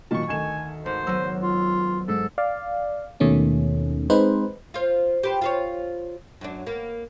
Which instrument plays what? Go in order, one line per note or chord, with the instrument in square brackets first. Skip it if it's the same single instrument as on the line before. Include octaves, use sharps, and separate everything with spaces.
[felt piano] A#2 D#3 F#3 [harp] A5 C#6
[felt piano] D2 D#3 E7 [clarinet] G#5
[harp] G#1 [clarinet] C5
[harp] F#3 B3 [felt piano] E6
[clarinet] F4
[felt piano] G#2 [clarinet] A4
[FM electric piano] D5 F5
D#2 B2 D#3 A3 C#4
G#3 C4 D#4 B4 C5
[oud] F4 C5
G4 B4 C5
F4 C5 C#5
F#2 F#3 D4
A#3 B3